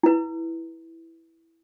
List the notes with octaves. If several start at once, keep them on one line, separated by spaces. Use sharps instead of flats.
E4 B4